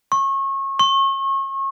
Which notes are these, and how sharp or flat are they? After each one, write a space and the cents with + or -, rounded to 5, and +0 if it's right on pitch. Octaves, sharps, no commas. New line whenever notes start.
C#6 -30
C#6 -35